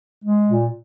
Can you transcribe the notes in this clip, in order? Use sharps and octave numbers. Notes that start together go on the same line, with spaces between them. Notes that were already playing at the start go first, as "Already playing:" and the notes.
G#3
A#2